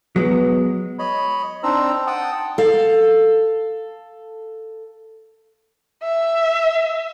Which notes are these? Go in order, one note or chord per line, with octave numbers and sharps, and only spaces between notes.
F#3 G#3 B3
C#5 D#5 B5
C4 D4 D#4 C5 A#5 E6
F#5 G5 A5 D#6
A4 F5
E5